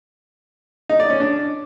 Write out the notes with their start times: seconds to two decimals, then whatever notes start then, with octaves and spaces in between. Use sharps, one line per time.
0.89 D#4
1.00 D5
1.10 C#4
1.20 D4